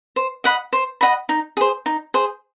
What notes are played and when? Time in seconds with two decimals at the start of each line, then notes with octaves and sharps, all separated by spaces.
0.16 C5
0.44 D#5 F#5 B5
0.73 C5
1.01 D#5 F#5 B5
1.29 D#4
1.57 G#4 C5
1.86 D#4
2.14 G#4 C5